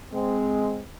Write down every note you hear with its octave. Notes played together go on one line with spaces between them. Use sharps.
G#3 C4